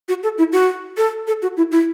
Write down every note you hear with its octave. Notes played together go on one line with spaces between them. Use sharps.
F#4
A4
E4
F#4
A4
A4
F#4
E4
E4